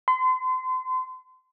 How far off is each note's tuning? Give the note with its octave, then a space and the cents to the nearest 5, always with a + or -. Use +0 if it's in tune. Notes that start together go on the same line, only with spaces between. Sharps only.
C6 -30